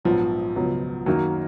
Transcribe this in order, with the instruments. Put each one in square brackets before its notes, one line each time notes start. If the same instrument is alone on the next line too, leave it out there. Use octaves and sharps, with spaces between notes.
[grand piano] A#1 G#2 F#3 B3 [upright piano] F3
[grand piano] C#2 B2 F#3 B3
[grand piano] F#2 D#3 A#3 D#4 [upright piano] F#3